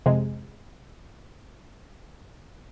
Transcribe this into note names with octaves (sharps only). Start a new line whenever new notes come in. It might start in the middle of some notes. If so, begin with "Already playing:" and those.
F2 C3 G#3